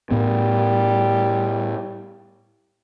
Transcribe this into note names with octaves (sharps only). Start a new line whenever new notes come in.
A2 G3 B3